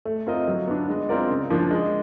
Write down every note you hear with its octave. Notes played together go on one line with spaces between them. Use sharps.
A3
C4 F4 A#4 D#5
F#3
B3 D4
G#3
C4 F4 A#4 D5
C#3
F3 A#3 D4
G#3